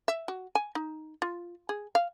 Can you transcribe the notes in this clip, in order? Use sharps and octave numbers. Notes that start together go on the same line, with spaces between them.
E5
F#4
G#5
D#4
F4
G#4
F5